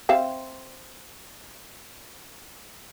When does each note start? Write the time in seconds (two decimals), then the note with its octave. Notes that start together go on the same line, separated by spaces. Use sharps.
0.09 C4 E5 F5